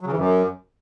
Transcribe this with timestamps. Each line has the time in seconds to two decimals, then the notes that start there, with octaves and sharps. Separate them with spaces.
0.01 F#3
0.06 C#3
0.12 E3
0.17 F#2